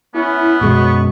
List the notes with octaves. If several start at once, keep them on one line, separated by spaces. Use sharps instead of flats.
B3 C#4 E4
F#2 B2 G#3 C#6